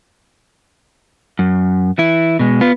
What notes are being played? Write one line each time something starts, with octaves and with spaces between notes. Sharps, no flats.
F#2
E3 E4
B2 G#3
B3 F4